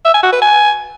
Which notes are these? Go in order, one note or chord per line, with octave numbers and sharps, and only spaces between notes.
E5
G#5
F#4
B4
G#5